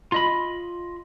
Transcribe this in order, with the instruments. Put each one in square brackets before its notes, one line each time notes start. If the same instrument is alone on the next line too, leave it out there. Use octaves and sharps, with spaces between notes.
[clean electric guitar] F4 D#5 B5